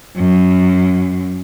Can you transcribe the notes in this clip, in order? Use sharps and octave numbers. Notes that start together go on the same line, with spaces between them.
F#2